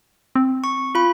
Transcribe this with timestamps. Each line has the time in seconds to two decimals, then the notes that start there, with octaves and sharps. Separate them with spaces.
0.35 C4
0.64 C#6
0.95 F4 B5